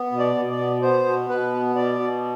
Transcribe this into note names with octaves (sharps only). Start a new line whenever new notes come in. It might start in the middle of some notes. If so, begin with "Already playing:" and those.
Already playing: B3
B2
D5
B2
D5
B3
B3 C5
B2
B2 B4
B3
B2 D5
B2